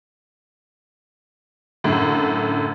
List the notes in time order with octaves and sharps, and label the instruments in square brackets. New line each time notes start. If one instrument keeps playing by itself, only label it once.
[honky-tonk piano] F#2 A2 D3